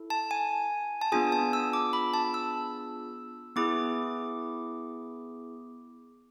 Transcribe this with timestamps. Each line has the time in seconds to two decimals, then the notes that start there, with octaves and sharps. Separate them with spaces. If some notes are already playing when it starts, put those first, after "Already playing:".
Already playing: E4 A4
0.10 A5
0.31 G#5
1.02 A5
1.12 B3 D4 F4 G#4 G#5
1.32 A5
1.53 E6
1.73 D6
1.93 B5
2.14 A5
2.34 E6
3.56 B3 E4 G#4 D6